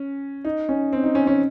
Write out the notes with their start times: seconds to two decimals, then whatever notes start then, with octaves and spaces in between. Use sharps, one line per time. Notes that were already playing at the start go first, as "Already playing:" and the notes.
Already playing: C#4
0.45 D#4
0.69 C#4
0.93 C4
1.04 D#4
1.15 C#4
1.27 C#4